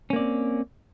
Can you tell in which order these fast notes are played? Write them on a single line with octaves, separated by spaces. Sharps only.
C#4 A#3 D5 C4